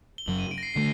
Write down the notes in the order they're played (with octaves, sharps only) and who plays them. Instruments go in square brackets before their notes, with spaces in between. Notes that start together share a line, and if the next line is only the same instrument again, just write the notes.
[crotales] G7
[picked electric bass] F#1 F#2 F#3 [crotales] F#7
[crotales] D#7
D7
A#6
C7
[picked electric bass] D3 A3 [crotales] C7